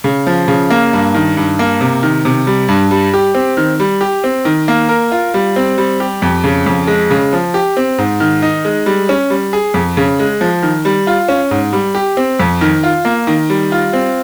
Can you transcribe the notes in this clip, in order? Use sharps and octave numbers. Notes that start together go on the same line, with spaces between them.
C#3
F3
C#3
A#3
G2
D#3
G2
A#3
C3
D#3
C3
G3
G2
G3
G4
C4
D#3
G3
G4
C4
D#3
A#3
A#4
F4
G3
C4
G3
G4
F2
C#3
F2
G#3
C#3
F3
G4
C4
G#2
D#3
D#4
G#3
G3
C#4
G3
G#4
F2
C#3
G#3
F3
D#3
G3
F4
C#4
G#2
G3
G4
C4
F2
D#3
F4
A#3
D#3
G3
F4
C4